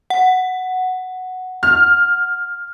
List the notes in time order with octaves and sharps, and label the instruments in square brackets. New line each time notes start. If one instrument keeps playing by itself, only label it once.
[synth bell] F#5
[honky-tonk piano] F6